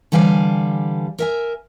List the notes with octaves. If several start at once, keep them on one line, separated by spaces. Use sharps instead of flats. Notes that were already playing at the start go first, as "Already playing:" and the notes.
D3 E3 G3 F5 G#5
A#4 E5 G#5